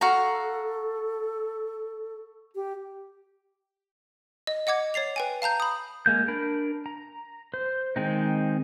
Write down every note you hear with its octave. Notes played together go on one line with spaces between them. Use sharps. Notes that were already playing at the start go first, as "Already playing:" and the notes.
F#4 A4 F5 A#5
G4
D#5
D#5 F#5 D6 G#6
C#5 A6 C7 F7
B4 G5 G#5
F5 A5 A#5 G6
B5 D#6
G#3 A#3 G6
D4 A#4 B5
A#5
C5
D#3 G#3 C4 D#4